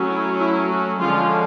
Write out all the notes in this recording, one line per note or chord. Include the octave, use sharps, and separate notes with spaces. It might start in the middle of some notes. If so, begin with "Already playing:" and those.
Already playing: F#3 A3 C#4
E4
E4
F#4
D3 F3 G#3 C#4 F4